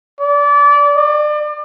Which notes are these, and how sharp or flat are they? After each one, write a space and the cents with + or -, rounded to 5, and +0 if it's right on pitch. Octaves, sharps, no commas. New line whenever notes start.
D5 -25
D5 +35